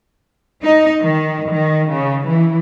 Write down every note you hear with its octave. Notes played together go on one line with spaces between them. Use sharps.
D#4
D#3
D#3
C#3
E3